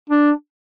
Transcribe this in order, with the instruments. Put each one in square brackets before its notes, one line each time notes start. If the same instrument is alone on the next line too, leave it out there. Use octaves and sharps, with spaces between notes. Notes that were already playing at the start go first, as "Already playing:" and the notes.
[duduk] D4